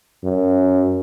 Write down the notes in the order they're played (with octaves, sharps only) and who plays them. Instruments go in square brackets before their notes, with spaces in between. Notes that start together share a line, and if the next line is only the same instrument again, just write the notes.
[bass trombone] F#2